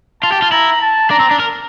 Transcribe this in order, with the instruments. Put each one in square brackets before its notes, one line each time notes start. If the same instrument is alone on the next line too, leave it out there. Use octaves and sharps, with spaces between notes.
[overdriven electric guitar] F4 [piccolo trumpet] A5
[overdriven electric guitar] G4
F4
[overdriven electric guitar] E4 [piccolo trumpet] A#5
[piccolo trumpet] A5
[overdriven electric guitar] D4 [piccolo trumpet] A#5
[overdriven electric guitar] C4
D4
A#4